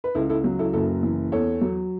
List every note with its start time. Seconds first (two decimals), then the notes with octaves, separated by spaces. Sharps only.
0.04 B4
0.15 C#2 E4 A4
0.29 E4 A4
0.44 F#3
0.59 E4 A4
0.73 F#1 E4 A4
1.03 E3
1.32 E2 A4 C#5
1.61 F#3